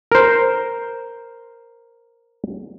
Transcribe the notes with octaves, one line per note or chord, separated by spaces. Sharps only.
A#4 C5